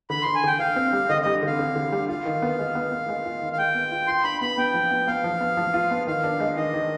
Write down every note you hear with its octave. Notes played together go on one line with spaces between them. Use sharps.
D3 B5
D3 C6
G#5
D3 G5
D3 F5
C4
G3
D3 D#5
G3 D#5
D3 F5
D3
D3
G3
F4 F5
D#3
B3
G#3
B3
B3
G#3
F4
D#3
F5
G#3 G5
B3
F4
F4 C6
D4 B5
B3 B5
B3 G5
F3
B3
B3 F5
F3
B3
F3
F4
B3
D#3 F5
D4
G#3
D#3 D#5
D#3